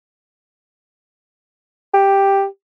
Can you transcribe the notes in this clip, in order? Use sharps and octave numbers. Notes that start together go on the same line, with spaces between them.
G4